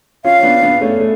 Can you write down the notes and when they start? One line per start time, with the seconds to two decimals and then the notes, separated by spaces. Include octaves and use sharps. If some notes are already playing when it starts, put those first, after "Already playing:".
0.24 C#4 F4 F5
0.39 C#4
0.43 B3 D4
0.62 B3 D4
0.81 A3 C#4
1.00 A3